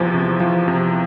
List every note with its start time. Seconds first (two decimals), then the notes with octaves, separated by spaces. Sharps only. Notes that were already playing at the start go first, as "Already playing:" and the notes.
Already playing: E2 C3 F3
0.14 C3
0.40 F3
0.68 C3